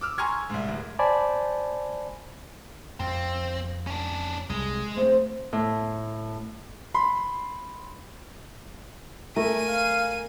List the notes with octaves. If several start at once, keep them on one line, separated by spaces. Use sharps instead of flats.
D6 E6 F6
G#5 A#5 C6 C#6 F6 G#6
C2 G#2
D1
C5 D5 G#5 A5 B5
F2 C4
C#4 D4
C2 G#3
A3 C4 C5
A2
B5 C6
A3 A#4 G#5 D#7
F5